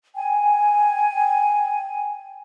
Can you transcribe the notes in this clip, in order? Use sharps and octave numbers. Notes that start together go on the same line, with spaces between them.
G5 G#5